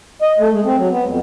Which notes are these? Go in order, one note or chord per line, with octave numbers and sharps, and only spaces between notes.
D#5
A3
G#3
C4
F#3
B3
F2